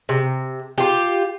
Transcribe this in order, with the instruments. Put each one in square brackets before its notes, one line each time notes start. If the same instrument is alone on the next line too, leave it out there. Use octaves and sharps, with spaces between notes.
[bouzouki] C3
F4 G4